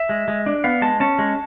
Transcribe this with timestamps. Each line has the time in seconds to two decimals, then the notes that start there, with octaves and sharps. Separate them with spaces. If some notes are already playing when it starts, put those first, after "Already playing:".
Already playing: E5
0.09 G#3
0.28 G#3
0.46 D4
0.64 B3 F5
0.82 G#3 A5
1.00 C#4 A5
1.19 G#3